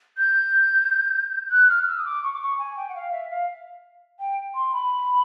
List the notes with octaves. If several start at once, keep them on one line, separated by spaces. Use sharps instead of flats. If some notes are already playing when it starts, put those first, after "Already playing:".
G6
F#6
F6
F6
E6
D#6
D6
C#6
D6
C#6
G#5
G5
F#5
F5
E5
F5
G5
C6
B5